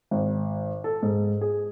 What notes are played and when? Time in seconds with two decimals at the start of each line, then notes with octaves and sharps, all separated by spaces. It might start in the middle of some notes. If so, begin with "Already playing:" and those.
0.11 G#1
0.84 A4
1.02 G#2
1.41 G#4